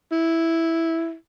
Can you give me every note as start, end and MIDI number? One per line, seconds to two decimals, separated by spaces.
0.12 1.14 64